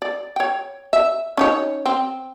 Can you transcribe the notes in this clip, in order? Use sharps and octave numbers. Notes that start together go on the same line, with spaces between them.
D5
C#5 G5
E5
C#4 D#4 C#5
C4